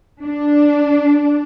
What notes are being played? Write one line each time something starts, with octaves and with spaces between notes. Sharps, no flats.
D4